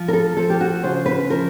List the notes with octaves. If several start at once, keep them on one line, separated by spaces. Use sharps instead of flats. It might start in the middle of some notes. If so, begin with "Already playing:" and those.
Already playing: F3
A#4
A4
F3 A4
G4
F#4
C#3 C5
B4
F3 A#4